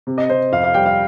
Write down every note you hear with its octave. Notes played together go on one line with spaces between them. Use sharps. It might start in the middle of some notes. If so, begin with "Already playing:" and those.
C3
D#5
C3 C5
F2 F5
F5
G3 G5
F5